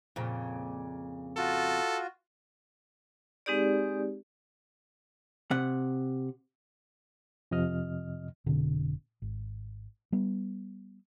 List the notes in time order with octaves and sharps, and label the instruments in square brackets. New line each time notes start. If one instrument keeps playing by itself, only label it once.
[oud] F2 A#2 C#3
[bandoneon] F4 F#4 [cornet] A4
[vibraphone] G#3 C4 D#4 G4 G#4 D5
[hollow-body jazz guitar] C3 F#5
[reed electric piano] F2 C3 F3 D#5 F6
[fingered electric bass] F1 B2 D3 C4
G#1
G3 B3